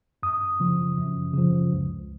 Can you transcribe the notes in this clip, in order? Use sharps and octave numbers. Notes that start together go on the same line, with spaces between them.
F#2 D#6
C#3 F3
F#2
C#3 F3
C#2